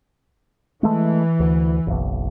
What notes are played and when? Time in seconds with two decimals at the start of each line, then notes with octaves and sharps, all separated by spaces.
0.83 E3 G#3 A3
1.40 D2
1.87 F#1 B1